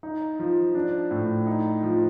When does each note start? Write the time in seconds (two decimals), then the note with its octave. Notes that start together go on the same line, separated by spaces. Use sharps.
0.03 D#4
0.39 F3
0.75 D4
1.11 A2
1.47 D#4
1.83 F3